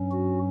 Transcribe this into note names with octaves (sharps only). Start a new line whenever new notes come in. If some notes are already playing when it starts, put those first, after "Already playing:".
Already playing: G2 F#3 C#4
F#4